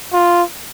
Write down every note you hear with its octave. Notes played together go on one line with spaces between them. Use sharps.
F4